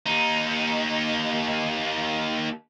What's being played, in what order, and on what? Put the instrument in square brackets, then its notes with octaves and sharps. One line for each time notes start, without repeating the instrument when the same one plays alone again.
[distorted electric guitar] D#2 D#4